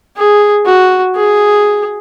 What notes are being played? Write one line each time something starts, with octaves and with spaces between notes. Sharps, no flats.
G#4
F#4
G#4